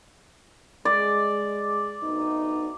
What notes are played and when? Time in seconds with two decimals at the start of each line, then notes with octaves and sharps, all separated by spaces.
0.85 G#3 D5
2.03 D2 B3 D#4